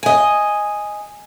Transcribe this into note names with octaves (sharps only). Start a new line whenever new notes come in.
D#5 G#5